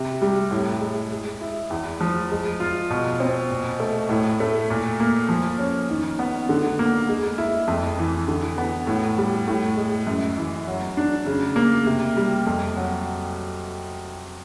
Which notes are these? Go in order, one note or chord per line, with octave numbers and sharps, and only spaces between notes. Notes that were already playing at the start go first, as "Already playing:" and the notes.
Already playing: C3
G3
A2
G#3
G#3
E4
E2
F3
G#3
F4
B2
C4
A#2
A3
A2
A3
A#2
A#3
F3
C#4
D#3
B3
D3
A#3
G#3
E4
F2
E3
D3
B3
A2
G3
A2
G#3
F#2
E3
F#3
D4
C#3
A#3
C3
G3
F2
F#3